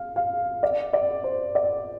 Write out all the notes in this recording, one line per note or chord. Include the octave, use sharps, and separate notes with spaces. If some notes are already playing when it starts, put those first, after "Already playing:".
Already playing: F5
F5
D5
D5
C5
D5